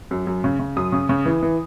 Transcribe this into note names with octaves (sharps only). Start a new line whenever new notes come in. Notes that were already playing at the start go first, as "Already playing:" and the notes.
F#2
F#2
C#3
C#3
F#2 D#6
C#3
C#3
E3
E3